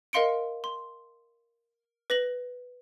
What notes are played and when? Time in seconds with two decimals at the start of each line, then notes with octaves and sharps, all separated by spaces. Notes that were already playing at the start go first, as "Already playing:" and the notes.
0.13 A#4 D#5 F5 C6 C#7 D7
0.64 C6
2.10 B4 A#6 F#7